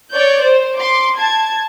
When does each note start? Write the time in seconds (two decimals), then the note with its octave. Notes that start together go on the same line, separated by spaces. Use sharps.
0.12 C#5 D5 G6
0.43 C5
0.76 C6 D6
1.17 A5 G#6